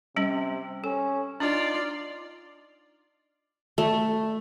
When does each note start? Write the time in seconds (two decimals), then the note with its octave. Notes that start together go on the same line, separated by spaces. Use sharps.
0.16 C3 G3 C#4
0.84 C#4 A4
1.40 D4 D#4 F4 D5
3.78 A3